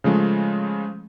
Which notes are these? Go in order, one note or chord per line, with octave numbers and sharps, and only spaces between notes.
C#3 F3 G#3 A3